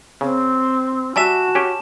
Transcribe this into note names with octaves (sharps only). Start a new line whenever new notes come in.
C#3 C4
G3 F#4 D5 E5 G#5 A5 E7
C#4 G4